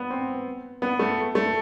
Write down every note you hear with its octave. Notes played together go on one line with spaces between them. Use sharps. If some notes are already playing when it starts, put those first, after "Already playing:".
Already playing: B3
C4
B3
A3
A3